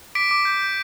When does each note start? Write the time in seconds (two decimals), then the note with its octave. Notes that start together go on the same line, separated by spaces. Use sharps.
0.15 D6 B6 D7
0.31 D6
0.45 G6
0.61 G6